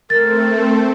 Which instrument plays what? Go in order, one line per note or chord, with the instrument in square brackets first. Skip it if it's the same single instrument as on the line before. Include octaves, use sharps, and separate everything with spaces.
[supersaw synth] A3 C4 A4 [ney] A#4 [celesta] A6